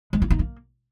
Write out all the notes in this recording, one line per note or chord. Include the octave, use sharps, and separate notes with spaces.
G#3
E4
D#4
A#3